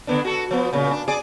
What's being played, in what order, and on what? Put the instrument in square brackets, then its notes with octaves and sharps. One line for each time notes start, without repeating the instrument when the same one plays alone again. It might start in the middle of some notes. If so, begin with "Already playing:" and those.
[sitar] D3 B3 D4
F#4 A4
F3 B3
A#2 C#3
D4
G#4 D5